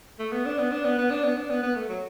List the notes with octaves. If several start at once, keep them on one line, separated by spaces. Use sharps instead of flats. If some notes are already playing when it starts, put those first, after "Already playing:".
A3
B3
D4
B3
D4
B3
B3
D4
B3
D4
B3
B3
A3
F#3